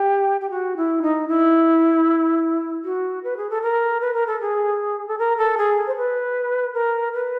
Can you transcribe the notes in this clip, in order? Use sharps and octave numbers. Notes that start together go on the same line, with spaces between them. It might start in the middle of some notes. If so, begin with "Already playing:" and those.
Already playing: G4
G4
F#4
E4
D#4
E4
F#4
B4
G#4
A4
A#4
B4
A#4
A4
G#4
A4
A#4
A4
G#4
C5
B4
A#4
B4